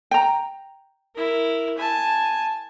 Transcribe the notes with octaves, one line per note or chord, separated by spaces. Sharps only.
G5 A#5
E4 A#4
G#5 A5